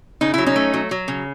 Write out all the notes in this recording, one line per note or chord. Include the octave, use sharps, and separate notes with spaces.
C#3 D#4
F#3 E4
C#4 D#4
A3
F#3
F#3
C#3